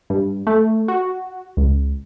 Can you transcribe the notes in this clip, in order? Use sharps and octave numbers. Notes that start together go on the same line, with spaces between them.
G2
A3
F#4
C#2